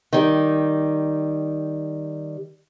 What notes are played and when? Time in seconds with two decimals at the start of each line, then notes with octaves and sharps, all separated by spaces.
0.13 D#3 G3